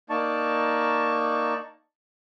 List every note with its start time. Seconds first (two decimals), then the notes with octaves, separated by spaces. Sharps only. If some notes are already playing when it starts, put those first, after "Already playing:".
0.10 A#3 D#4 D5 A5 C#6